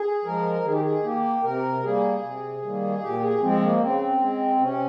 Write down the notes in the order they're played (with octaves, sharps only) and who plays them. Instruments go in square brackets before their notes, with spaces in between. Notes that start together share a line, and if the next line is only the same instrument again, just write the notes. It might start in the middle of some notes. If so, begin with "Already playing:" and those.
Already playing: [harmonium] G#4
F3 G#3 A#4
D#3 G#4
G4
G#4
A#3 G4
C3 A#4
G3 A#3 G#4
C3
D#3 G3 A#3
A#2 G4
G#4
F3 G#3 C4
A#3
C#3 C4
G#3
C3 C#4